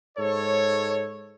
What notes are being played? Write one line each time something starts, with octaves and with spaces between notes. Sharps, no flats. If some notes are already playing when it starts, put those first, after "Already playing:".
G#2 A4 C#5